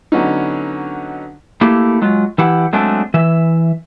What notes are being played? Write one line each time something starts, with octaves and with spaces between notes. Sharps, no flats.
D3 F#3 B3 C#4 D#4
A3 A#3 E4 G4
F#3 G#3 F4
E3 E4 G4 F#5
F#3 G#3 A3 C4 D4
E3 E5